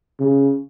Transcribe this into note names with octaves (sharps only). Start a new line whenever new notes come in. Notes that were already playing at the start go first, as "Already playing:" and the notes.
C#3